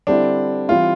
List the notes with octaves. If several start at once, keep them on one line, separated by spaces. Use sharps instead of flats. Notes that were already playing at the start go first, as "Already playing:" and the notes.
D3 G3 C4 D4 E4
E3 G3 C4 E4 F4